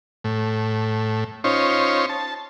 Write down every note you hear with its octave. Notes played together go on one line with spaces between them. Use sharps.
A2
C#4 D#4 F4 C5 C#5
A5